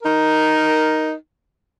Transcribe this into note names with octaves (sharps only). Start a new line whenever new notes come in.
D#4 A#4